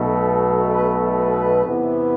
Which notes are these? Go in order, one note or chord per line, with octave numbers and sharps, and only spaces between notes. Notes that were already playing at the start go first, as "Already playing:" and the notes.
Already playing: B1 B2 A3
B4
B4
E2 C3 E3 B3